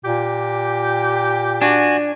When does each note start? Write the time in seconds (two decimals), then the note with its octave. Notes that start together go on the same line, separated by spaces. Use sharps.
0.05 A#2 G4
1.62 D4 F#4 G#5